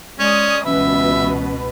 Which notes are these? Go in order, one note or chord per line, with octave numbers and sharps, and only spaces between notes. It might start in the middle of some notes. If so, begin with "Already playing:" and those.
G#3 C#4 D5 D#6
C#2 B2 E3 C#4 B4 E5